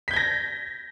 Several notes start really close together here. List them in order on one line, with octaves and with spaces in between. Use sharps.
B6 G6 G#6 A#6